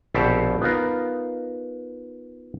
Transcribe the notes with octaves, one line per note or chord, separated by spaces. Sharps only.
A#1 B2 C4 G4 A4 C5
B3 D#4 F4 A#4